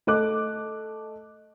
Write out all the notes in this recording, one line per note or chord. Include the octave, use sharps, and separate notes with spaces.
A3 D#5 D6 F#6